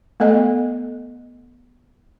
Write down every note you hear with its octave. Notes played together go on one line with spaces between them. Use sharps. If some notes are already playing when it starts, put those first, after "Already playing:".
A3 B3 A4 D#5